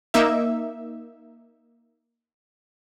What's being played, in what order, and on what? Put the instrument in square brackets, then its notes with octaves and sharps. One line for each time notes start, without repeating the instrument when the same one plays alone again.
[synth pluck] A#3 D#4 E5